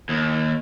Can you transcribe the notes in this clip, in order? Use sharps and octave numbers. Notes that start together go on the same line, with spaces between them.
D#2